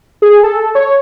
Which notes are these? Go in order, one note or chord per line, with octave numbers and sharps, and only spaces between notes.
G#4
A4
C#5